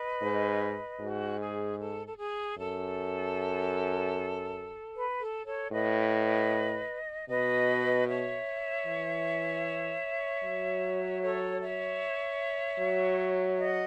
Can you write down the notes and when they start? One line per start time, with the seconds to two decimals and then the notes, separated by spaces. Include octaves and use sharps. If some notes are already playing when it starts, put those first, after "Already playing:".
Already playing: B4 D#5
0.22 G#2
1.00 G#2 F#4
1.40 G#4
1.80 A4
2.07 A4
2.18 G#4
2.57 F#2 A4
4.94 B4
5.19 A4
5.45 A4 C#5
5.72 A2 B4 D#5
7.29 B2 B4 D#5
8.08 C#5 E5
8.86 E3
10.43 F#3
11.23 A4 C#5
11.61 C#5 E5
12.79 F#3
13.58 D#5 F#5